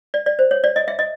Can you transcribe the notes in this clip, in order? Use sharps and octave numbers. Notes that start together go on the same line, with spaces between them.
D5
D5
C5
C#5
D5
D#5
E5
D#5